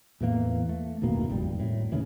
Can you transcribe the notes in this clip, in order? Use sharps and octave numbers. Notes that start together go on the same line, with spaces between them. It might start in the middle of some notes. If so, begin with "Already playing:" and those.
E2 A2 E3 A#3
A3
F#1 D#2 B2 A#3
G#1 F2 B2 G3
A2
D#2 G#2 C#3 E3